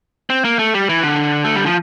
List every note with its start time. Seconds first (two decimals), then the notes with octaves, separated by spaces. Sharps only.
0.30 C4
0.45 A#3
0.59 A3
0.74 G3
0.89 E3
1.03 D3
1.45 A3
1.55 G3
1.66 F3